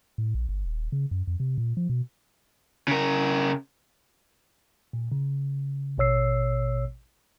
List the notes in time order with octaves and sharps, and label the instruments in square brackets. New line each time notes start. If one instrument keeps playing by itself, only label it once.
[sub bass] A2
A#1
G1
D#1
C#3
F#2
F2
C3
A#2
F3
B2
[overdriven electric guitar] C#3 A#4
[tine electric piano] A#2
C#3
A1 B2 C#5 E6 C7